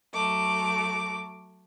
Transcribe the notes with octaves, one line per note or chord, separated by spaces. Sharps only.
F#3 A3 D6